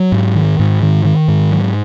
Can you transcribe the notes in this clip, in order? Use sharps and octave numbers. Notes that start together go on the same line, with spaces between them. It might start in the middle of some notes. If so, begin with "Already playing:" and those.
Already playing: F#3
G#2
D#3
G#2
D#3
D#3
G#2
F#3